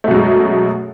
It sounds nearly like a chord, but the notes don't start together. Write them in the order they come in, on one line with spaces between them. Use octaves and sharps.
A3 B2 F#2 G#3